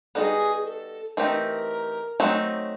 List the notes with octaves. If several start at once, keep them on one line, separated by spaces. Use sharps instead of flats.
G3 B3 D#4 F#4 G#4 A4
A4
E3 A3 C4 D#4 G4 A#4
F#3 A3 C4 D#4